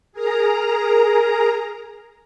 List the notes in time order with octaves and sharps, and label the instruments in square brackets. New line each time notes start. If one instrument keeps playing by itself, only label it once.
[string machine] G#4 A#4 A#5